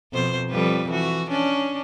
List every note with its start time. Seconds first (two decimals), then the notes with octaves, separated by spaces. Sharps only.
0.13 F2 B2 C5
0.51 F2 G3 B4
0.89 E3 F#4
1.30 C#4 D4